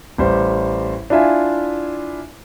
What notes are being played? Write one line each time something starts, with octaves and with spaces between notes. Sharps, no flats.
A1 G3 C5
D4 E4 F4 E5 G#5